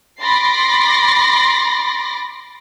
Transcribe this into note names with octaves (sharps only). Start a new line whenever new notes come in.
B5 C6 D6 A6 A#6 C7